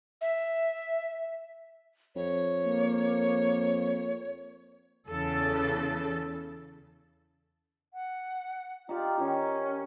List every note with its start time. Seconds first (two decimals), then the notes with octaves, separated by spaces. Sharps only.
0.21 E5
2.16 F2 C#5
2.65 A#3
5.09 E2 C#3 A4
7.93 F#5
8.89 D#4 F4 G4 D5
9.19 D#3 C#4